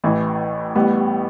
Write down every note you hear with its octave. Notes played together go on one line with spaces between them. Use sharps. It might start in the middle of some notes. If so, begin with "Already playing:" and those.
A1 A2 E3
A1 A2 G3 B3